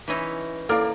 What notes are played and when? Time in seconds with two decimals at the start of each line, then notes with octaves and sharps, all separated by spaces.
0.08 E3 C#4 D#4 E4 B5
0.69 A#3 E4 A4 D5 F5 D6 F6